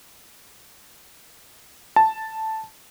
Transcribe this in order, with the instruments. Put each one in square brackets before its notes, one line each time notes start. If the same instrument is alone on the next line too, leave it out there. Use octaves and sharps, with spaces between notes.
[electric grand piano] A5